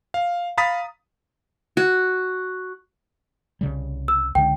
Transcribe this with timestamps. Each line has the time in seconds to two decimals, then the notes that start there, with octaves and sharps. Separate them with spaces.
0.14 F5
0.58 F5 A#5 B5 D#6 A6 B6
1.77 F#4
3.61 C2 C#3 G3
4.08 E6
4.35 C#2 D3 G5